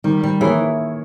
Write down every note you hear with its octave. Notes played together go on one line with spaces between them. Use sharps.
D#3 G3
G3
E3 A#3 E4 G#4 C#5